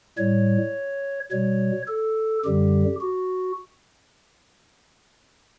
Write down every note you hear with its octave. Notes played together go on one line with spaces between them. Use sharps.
A2 G3 C#5
B2 G3 C#5
A4
F#2 D3 G3 G4
F#4